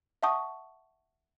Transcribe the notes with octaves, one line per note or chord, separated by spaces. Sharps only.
E5 F#5 A5 C#6 D#6